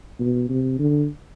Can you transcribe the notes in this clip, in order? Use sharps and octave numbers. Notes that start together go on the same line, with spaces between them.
B2
C3
D3